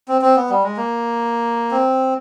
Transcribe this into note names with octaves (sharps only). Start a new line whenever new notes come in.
C4
C4
B3
G3
G#3
A#3
C4